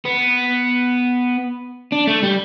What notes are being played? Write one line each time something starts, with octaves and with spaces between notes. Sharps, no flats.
B3
D4
A3
G3